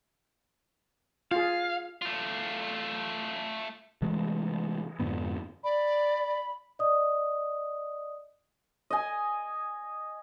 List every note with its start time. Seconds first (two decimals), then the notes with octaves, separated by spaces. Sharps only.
1.31 F4 G#4 F5
2.02 A3 F4
4.02 C3 E3 G#3 A3
4.99 F2 G#2 D3 B3
5.64 D5 B5
6.79 D5 D#5 D#6
8.90 D#5 G#5